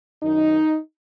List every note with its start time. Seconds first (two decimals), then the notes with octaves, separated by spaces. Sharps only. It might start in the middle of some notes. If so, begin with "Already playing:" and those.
0.23 F#2 D#3 D#4